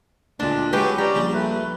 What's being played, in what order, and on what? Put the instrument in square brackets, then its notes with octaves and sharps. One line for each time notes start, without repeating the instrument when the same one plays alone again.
[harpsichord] D2 A#2 [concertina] G#3 [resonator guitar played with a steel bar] D4
[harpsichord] F#3 G#3 [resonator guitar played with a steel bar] G4 B4 [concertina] G5 C#6 D6
[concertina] C#4 D5 A#5 [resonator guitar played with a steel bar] G4
[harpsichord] A#1 G3
[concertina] A3 B4